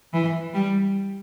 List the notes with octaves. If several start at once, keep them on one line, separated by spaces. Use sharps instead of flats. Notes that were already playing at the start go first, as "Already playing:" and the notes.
E3
G3